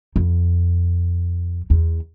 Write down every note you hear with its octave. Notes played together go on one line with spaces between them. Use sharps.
F2
E2